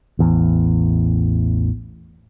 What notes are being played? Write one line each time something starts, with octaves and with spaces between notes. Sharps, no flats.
A1 E2